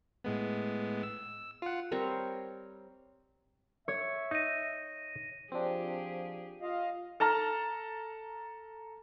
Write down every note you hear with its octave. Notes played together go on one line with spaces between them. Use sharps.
A2 G#3 B3
E6
F4 F#5
G3 C4 A#4 C#5
C#5 E5
D#4 A#6 D#7
F3 C4 D4 G4 G#4
F4 D#5 F5
A4 A5 A#5 F6